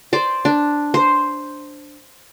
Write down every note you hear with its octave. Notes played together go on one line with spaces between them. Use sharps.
C5 D5
D4
C5